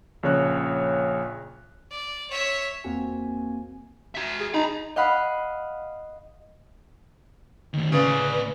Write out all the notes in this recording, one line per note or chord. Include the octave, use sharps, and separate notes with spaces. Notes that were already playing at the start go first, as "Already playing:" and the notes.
A#1 C#3 C#5 F#6
D5
C#5 E5
E2 A#3 C4 F#4 G#5
F#4 E5
G#4
D#4 A#5 B5
D#5 F5 F#5 B5
D#3 A3
A2 C#3 B4 D5